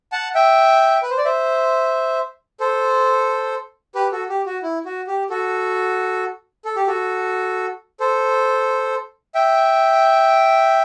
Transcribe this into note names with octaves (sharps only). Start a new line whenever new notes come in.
F#5 A5
E5 G5
B4
C5
D5
C5 E5
A4 C5
G4 B4
F#4 A4
G4
F#4
E4
F#4
G4
F#4 A4
A4
G4
F#4 A4
A4 C5
E5 G5